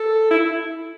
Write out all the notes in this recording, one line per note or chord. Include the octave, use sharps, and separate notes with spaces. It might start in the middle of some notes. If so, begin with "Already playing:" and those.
Already playing: A4
E4